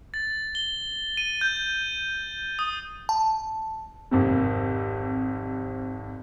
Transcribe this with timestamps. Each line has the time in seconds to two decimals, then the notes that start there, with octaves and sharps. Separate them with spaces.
0.14 A6
0.55 G7
1.17 D#7
1.41 G6
2.59 D#6
3.09 A5
4.11 G#1 F2 C3